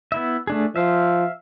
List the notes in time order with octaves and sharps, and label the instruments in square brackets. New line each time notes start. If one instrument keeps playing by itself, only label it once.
[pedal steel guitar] B3 E4 E5
A3 D4 G#4
[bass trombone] F3 [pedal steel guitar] E5 F5